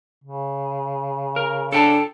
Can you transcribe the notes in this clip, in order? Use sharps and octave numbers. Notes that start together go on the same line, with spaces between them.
C#3
A#4
D4 A4 G5 A5